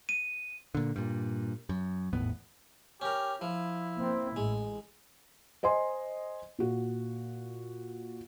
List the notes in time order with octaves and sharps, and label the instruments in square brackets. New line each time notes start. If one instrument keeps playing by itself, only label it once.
[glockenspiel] D#7
[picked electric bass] A#2 D3
G2 A#2
F#2
G#1 E2 A2 B3
[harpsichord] C#4 A#4 [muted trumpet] G4
[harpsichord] F3 [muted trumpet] E4
[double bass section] A#3 C4
[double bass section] A1 A2 [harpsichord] G#3
[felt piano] C5 D#5 G#5 C6
A#2 F#4